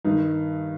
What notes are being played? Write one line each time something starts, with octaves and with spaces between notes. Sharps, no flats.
G2 D#3 D#4